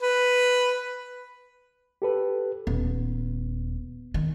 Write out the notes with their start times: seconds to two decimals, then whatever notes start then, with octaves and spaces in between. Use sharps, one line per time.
0.01 B4
2.02 G4 A4 B4
2.67 D#1 B3
4.14 D#3